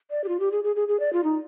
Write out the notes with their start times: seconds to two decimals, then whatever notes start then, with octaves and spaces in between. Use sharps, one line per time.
0.11 D5
0.24 G4
0.28 F4
0.40 G4
0.52 G#4
0.64 G#4
0.76 G#4
0.88 G#4
1.00 D5
1.13 F4
1.24 D#4